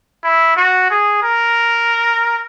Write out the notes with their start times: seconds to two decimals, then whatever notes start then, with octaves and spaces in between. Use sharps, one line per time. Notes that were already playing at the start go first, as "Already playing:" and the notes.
0.24 E4
0.56 F#4
0.91 G#4
1.23 A#4